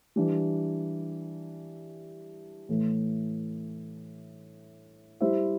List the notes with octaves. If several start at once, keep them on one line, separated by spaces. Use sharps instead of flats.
E3 G3 D4
A2 E3 A3
G3 E4 C5 E5